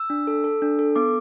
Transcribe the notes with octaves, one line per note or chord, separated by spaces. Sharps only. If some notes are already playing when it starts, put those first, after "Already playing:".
Already playing: E6
D4
A4
A4
D4
A4
B3 D6